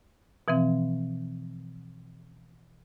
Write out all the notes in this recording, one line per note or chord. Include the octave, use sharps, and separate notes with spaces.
B2 E3 F3 C4